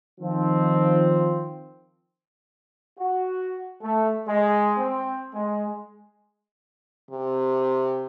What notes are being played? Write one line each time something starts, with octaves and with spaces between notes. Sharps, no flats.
D#3 F3 C4
F#4
A3
G#3
C4
G#3
C3